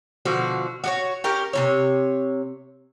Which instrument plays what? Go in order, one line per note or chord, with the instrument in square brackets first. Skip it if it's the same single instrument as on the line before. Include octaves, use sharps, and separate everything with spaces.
[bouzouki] B2 D3 F3 F#4
F#4 G4 C#5
C#4 G4 A#4
C3 D#3 C#5